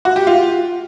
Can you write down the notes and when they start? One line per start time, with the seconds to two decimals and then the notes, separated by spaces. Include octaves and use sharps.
0.05 F#4
0.16 G4
0.27 F4